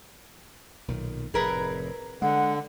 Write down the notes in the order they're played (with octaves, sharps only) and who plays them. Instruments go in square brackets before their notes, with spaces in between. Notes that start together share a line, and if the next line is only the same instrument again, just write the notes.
[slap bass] B1 A#2 D#3
[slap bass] F1 A2 C3 [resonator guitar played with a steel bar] G#4 A#4 B4
[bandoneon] D3 [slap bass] G#3 [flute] F#5